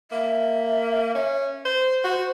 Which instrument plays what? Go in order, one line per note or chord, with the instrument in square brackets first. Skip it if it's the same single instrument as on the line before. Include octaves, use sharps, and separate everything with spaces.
[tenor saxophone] A#3 [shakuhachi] E5
[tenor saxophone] C#4
C5
[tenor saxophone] F#4 [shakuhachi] C5